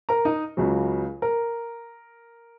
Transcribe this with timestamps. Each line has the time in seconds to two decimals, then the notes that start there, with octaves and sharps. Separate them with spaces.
0.09 A#4 A#5
0.25 D#4 D#5
0.57 C#2 C#3 F#3
1.22 A#4